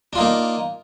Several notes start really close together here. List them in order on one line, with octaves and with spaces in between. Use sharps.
D4 F4 D#4 A#3